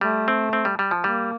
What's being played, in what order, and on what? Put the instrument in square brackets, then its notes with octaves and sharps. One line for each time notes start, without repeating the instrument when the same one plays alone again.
[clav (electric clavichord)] G3 [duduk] A3
[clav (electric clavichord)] C4
C4
G3
G3
F3
[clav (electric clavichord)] G3 [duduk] A#3